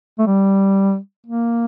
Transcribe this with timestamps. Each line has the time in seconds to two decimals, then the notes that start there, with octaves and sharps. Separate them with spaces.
0.19 A3
0.27 G3
1.27 A#3